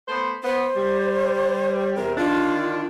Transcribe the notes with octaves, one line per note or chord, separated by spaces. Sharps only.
A3 B3 C5
B3 C5
G3
E2 C3 A#4
D3 D#3 D4 F4